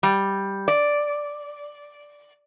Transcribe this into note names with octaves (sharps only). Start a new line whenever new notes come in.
G3
D5